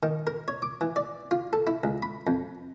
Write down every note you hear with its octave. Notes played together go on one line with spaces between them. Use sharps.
D#3
A#4
C#5
D6
E3
D5
F4
A4
E4
C#2
B5
F2